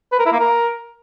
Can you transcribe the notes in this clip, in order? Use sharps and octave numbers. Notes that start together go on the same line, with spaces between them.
B4
A#4
E4
A#3
A#4